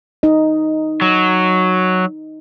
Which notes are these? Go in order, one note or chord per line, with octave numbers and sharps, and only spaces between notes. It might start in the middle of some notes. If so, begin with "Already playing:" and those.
D#4 D#5
F#3